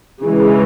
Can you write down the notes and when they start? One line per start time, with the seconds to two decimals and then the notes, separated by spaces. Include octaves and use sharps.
0.23 C#3 E3 G#3